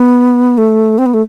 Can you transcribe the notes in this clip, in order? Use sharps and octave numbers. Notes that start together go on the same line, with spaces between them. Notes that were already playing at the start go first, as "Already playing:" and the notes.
Already playing: B3
A3
C4
B3
A3